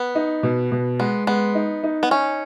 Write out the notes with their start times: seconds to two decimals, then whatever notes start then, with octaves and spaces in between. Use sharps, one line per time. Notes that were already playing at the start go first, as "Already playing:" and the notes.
Already playing: B3
0.15 D#4
0.43 B2
0.72 B2
1.00 G#3 B3
1.27 G#3 B3
1.55 D#4
1.84 D#4
2.03 B3
2.11 C#4 D#4